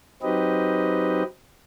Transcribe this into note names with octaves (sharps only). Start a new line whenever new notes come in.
F#3 C4 D#4 G4 B4 D#5